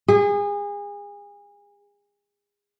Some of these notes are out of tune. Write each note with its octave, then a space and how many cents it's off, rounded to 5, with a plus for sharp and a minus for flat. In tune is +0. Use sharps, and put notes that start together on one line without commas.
G#4 -30